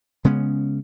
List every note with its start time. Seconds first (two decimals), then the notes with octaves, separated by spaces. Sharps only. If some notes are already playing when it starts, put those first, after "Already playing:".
0.25 C#3 G#3 B3 C#4